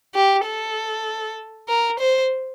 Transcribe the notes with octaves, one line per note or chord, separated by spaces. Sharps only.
G4
A4
A#4
C5